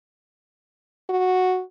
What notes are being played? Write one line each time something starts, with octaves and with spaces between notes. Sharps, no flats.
F#4